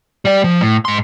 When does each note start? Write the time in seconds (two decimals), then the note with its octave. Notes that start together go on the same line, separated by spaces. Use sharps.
0.25 G3 D5
0.44 F3
0.61 A2
0.85 G#2 C6